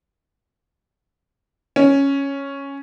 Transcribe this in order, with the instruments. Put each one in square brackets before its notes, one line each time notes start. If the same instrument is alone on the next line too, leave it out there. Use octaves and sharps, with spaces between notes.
[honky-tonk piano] C#4